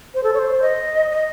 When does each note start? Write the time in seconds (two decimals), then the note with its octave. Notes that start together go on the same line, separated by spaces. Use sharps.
0.15 C5
0.23 A4
0.34 C#5
0.39 C5
0.62 D#5
1.11 D#5